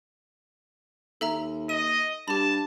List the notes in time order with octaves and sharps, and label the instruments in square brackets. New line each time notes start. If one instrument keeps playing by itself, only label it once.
[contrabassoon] D#2 [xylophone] A4 E5 A#5
[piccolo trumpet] D#5 [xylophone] D#7
[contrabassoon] G2 [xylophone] G4 B5 [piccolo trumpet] A5